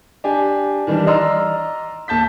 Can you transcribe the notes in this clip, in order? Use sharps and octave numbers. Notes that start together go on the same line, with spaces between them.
D4 G4 G#5
D#3 E3 G3 D4
D5 D#5 A#5 C6 E6 F6
D#2 A5 G6 B6